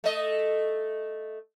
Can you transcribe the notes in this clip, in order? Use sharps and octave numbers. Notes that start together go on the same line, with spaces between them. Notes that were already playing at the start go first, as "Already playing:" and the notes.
A3 D#5